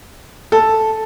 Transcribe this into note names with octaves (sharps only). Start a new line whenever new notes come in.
A4